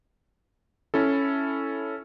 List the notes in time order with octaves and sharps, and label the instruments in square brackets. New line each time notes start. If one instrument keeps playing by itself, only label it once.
[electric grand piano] C#4 E4 A4